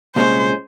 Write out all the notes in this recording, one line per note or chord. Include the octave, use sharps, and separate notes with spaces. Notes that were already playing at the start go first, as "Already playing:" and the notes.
C2 A#2 G#3 C#4 C5